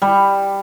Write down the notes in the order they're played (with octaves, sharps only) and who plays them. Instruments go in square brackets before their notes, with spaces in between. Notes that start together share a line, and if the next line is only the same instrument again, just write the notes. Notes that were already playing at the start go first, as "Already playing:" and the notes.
[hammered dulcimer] G3